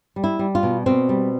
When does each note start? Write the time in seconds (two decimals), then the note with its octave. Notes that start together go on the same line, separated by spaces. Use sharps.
0.16 G3
0.24 E4
0.39 G3
0.55 F4
0.63 B2
0.86 B2 C4
1.09 G3